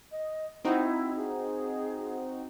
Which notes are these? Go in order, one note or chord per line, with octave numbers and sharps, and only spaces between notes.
D#5
C4 D#4 E4 F#4
G#4